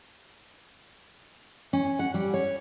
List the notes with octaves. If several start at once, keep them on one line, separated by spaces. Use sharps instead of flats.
C#4
F#5
G3
C#5